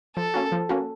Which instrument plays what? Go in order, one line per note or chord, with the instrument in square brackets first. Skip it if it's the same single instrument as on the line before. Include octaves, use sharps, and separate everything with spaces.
[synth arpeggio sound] F3 [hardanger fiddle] A4
[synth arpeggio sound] A#3 C#4 F#4
F3
A#3 C#4 F#4